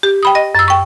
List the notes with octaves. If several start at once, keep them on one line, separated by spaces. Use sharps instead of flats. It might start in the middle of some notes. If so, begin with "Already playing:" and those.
G4
G5 B5 D#6
D#5 A#6
F#2 E6
G5 C#6